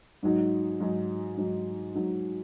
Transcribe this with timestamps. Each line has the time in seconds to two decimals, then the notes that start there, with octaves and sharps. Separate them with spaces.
0.23 G#2 F#3 D#4
0.80 G#2 F#3 D#4
1.37 G#2 F#3 D#4
1.95 G#2 F#3 D#4